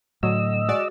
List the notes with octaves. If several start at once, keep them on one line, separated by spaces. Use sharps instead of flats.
A2 D3 F#3 D#5 E6
G#3 F#4 D5